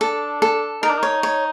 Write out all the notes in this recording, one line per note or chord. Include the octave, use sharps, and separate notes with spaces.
D4 A4
A4
D#4 A#4
D4
D#4 C#5
C#5